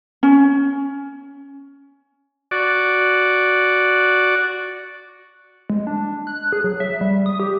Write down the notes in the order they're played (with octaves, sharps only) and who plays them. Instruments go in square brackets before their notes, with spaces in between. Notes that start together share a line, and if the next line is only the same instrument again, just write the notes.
[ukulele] C#4
[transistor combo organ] F#4 D5
[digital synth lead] G#3
D4
F#6
G#4
F#3
E5
G3
D#6
G4